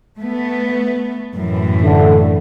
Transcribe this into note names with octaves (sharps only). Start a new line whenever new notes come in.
A3 B3
F#2 A2 E3
D3 A3